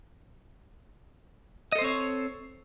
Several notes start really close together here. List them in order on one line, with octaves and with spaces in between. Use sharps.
D#5 A4 C5 C4 C#5